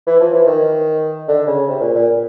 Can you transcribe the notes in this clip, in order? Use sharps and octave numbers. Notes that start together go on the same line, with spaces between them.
E3
F3
E3
D#3
D3
C#3
C3
A#2
A#2